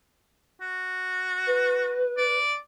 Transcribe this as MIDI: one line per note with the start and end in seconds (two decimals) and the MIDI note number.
0.61 2.01 66
1.46 2.35 71
2.18 2.55 74